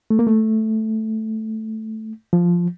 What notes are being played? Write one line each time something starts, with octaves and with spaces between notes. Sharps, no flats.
A3
A#3
A3
F3